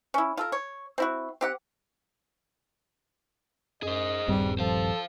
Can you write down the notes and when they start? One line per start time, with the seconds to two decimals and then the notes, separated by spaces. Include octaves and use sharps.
0.14 C#4 E4
0.37 F4 A4 A#4
0.52 C#5
0.98 C4 E4 F#4
1.41 C4 G4 F#5
3.83 F#2 G#4 C5 D#5
4.28 D#1 G2 G3 C4
4.59 F3 A4 C5 F5